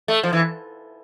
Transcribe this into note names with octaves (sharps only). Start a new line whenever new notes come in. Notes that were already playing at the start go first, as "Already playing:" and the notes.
A3
F3
E3